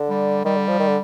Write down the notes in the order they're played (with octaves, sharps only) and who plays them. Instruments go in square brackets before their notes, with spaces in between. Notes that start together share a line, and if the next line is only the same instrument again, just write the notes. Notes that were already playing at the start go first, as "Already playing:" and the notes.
Already playing: [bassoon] D3
[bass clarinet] G3
[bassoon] D#3 [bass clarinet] G3
[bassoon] D3
F3
D#3
D3